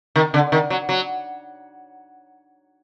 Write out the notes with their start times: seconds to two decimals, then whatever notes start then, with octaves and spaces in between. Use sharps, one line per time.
0.16 D#3
0.34 D3
0.52 D#3
0.70 F#3
0.89 F#3